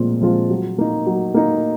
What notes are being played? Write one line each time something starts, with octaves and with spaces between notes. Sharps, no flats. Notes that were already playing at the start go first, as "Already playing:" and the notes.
Already playing: A#2 F3 G#3 C4 F4
F3 G#3 C4 F4
F#3
A#3 D#4
F#3
A#3 D#4